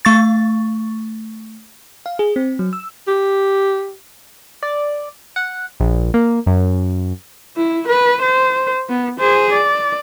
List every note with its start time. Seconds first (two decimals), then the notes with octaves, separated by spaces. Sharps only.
0.05 A3 C#6 A6
2.06 F5
2.19 G#4
2.36 C4
2.59 F#3
2.73 E6
3.07 G4
4.63 D5
5.36 F#5
5.80 A#1
6.14 A#3
6.46 F#2
7.57 E4
7.88 B4
8.22 C5
8.89 B3
9.20 G#4 C5
9.53 D5